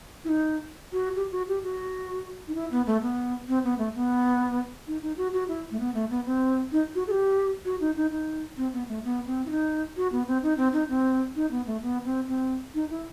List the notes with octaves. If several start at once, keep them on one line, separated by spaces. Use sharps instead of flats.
E4
D#4
F#4
G4
F#4
G4
F#4
D#4
E4
B3
A3
B3
C4
B3
A3
B3
D#4
D#4
F#4
F#4
E4
A3
B3
A3
B3
C4
D#4
F#4
A4
G4
F#4
D#4
D#4
D#4
C4
B3
A3
B3
C4
E4
D#4
F#4
B3
C4
D#4
C4
D#4
C4
D#4
B3
A3
B3
C4
C4
D#4
E4